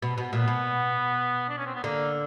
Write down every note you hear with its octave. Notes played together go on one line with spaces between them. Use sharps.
B2
B2
A#2 B3
B2
D4
C#4
C4
B3
D3 A#3